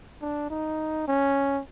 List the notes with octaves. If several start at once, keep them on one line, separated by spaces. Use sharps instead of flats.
D4
D#4
C#4